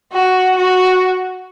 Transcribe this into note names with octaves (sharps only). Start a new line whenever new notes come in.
F#4
F#4